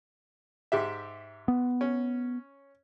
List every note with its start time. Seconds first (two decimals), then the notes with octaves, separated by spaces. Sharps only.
0.72 G#2 G4 E5
1.48 B3
1.81 C#4